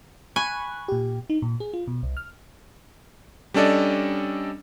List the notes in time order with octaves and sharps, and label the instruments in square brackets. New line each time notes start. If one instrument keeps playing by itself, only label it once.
[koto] G#5 [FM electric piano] B5 C#6 F#6
[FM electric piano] A#2 G4
D#4
A#2
G#4
F4
B2
C2
F6
[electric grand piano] G3 C#4 D4 A4 D5 D#5